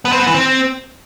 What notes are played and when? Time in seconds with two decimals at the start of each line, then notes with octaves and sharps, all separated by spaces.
0.05 B3
0.12 C4
0.20 B3
0.27 E3
0.34 C4